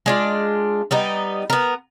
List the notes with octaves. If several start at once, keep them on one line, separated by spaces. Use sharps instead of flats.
G#3 D4 F4
G3 B3 D#4
B3 A#4